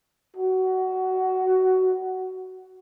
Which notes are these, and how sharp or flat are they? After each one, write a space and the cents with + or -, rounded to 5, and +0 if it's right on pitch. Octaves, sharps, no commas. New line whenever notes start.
F#4 +15